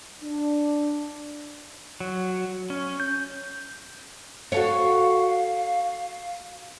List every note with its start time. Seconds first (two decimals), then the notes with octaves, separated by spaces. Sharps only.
0.21 D4
2.00 F#3
2.70 C#4
3.00 G6
4.52 F#4 A4 C#5 F5